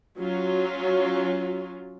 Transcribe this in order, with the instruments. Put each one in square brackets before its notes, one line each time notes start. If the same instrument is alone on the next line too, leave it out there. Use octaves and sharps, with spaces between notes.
[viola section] F#3 C#4 F4